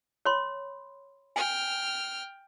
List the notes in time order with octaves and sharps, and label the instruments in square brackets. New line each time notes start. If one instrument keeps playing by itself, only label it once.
[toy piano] C#5 B5 C6
[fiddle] G5 F6 [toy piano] G#5